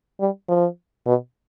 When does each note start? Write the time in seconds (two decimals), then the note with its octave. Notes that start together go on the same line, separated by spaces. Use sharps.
0.20 G3
0.49 F3
1.06 B2